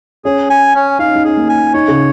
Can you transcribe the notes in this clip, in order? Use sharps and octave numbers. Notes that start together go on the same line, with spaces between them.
C#4 G#4
G#5
C#4
D#4 F5
C#4
D#4
C#4 G#4
A#3
G#5
D#4 C#5
C#3